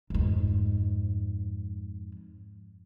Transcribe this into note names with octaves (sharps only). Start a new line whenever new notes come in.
F2 G#2